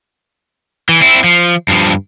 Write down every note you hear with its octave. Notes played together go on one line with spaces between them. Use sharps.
E3
C4 E4
F3
G2 F3